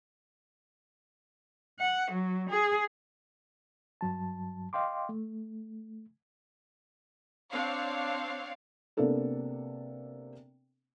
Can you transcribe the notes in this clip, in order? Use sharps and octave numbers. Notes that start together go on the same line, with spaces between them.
F#5
F#3
G#4
G2 F#3 A5
D#5 F5 G5 C6 D6
A3
C4 D4 C#5 F5
C3 A#3 B3 D4 A4 A#4